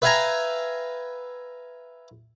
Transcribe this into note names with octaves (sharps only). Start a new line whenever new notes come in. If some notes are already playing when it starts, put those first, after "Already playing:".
B4 E5 F5 G5 G#5 A#5